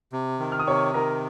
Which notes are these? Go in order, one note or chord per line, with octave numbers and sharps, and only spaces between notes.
C3
D#3
F6
D#6
C3 C#5 C#6
D#3 A#4 A#5